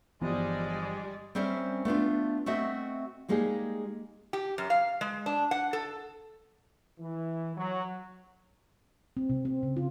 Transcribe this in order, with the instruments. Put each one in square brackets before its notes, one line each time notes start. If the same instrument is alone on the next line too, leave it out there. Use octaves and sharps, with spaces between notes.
[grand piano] G1 F3 [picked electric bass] E3 B3 [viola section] G3 D5 D#5 [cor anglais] G#3
[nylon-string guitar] G3 C4 C#4 A#4 C5 E5
A3 B3 D4 F4
A3 C4 F#4 D#5 E5
G3 G#3 A#3 D#4 G4 G#4
[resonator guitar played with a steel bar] G4
F#2
F5
G#3
D4
F#5
A4
[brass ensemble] E3
F#3
[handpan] C4
C3
C4
C#3
F4